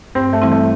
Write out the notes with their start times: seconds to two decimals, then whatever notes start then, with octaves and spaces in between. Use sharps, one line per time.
0.15 G2 C4
0.33 A3
0.42 E3 G3 C4 E4
0.51 A3